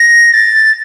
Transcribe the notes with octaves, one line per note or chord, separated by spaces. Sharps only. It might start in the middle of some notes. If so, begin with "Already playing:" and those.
Already playing: A#6
A6